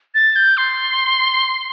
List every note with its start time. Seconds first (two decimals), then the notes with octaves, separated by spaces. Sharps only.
0.15 A6
0.36 G6
0.57 C6